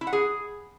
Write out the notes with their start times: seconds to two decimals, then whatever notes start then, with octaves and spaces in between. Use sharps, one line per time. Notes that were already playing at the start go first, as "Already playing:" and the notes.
0.01 E4
0.07 F#5
0.13 G#4